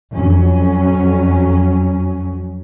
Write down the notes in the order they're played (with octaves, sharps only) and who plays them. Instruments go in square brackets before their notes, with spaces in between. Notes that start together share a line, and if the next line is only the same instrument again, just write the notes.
[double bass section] F2 F#3 C#4